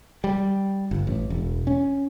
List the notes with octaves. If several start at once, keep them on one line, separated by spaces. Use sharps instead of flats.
G3
G1
A1
E1
C#4